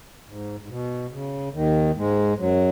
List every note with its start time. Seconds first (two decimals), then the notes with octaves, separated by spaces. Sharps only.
0.27 G#2
0.60 G#2
0.68 B2
1.11 C#3
1.53 D#2 D#3
1.95 G#2 G#3
2.38 F#2 F#3